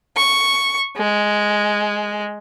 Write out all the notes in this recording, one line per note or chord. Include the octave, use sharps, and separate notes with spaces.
C#6
G#3